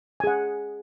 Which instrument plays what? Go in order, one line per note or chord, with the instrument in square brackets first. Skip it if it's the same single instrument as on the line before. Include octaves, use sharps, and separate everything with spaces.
[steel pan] G#5
G#4
F#5